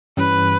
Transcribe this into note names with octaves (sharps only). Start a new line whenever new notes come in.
G2 E3 G3 C#4 B4